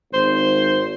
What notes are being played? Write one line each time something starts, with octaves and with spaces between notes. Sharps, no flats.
G#1 C5